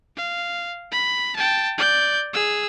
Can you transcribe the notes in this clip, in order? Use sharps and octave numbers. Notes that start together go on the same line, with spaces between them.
F5
B5
G5 A5
D5 G6
G#4 E6